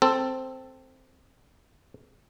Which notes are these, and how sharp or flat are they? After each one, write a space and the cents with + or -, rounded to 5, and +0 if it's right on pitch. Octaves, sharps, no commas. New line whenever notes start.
C4 +0 A4 +10